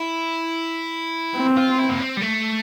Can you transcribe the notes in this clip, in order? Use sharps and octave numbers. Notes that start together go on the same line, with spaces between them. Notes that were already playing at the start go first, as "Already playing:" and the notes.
Already playing: E4
C4
F4
E4
A#3
C4
G3
A3